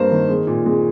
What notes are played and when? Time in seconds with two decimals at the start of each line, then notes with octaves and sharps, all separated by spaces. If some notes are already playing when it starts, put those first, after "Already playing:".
Already playing: G2 A#3 C5
0.11 D#3
0.29 G#3
0.47 A#2
0.66 G#3